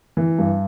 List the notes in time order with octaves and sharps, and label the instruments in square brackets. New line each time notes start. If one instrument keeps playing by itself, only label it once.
[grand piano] E3
G2